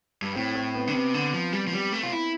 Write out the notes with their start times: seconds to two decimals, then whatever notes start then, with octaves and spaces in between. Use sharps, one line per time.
0.22 G2
0.35 A2 C4
0.55 C4
0.75 B3
0.88 D3
0.93 C3 B3
1.14 D3
1.34 F3
1.53 G3
1.67 F3
1.73 G3
1.92 A3
2.03 F4
2.12 E4